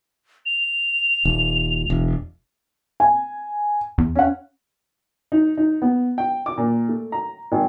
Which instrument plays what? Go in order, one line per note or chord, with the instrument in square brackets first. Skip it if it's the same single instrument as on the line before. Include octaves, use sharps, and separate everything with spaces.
[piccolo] F7
[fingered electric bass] D#1
E1
[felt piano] G#5
[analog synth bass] E2
[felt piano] C#4 F#5
[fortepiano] D#4
D#4
B3
G5
D6
A#2
A3
A#5
G#1